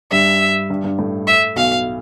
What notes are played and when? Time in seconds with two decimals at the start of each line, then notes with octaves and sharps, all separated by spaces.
0.11 G2 G3 E5
0.70 G2 G3
0.84 G2 G3
0.98 A2 A3
1.27 E5
1.56 B1 B2 F5